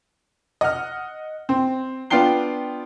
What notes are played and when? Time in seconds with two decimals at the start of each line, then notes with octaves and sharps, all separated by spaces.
0.61 D#5 F#5 F6
1.49 C4
2.10 B3 D4 F4 G5 C7 G7